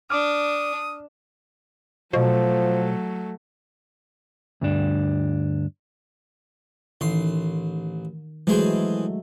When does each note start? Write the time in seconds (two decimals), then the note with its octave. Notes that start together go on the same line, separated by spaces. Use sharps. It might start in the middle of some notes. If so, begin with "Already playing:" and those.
0.10 D4 D6 D#6 F6
2.13 B2 F3 F#3 A3
4.61 D2 G2 D4
7.01 A1 D#3 C6
8.47 E3 F#3 G#3 A3 G#4 C5